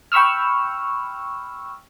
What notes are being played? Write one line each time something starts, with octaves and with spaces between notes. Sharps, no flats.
G5 B5 C#6 E6 F6